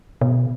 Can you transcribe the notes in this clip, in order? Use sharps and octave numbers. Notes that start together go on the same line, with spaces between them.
B2